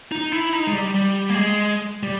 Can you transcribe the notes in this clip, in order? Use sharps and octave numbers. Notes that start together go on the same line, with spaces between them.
D#4
E4
D#4
G#3
G3
G3
A#3
G#3
G3